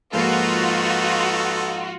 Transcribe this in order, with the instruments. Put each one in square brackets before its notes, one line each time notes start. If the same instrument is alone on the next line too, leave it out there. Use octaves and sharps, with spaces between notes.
[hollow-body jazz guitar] G#2 F3 A#3 [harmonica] D#4 A4 B4 [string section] F4 F#4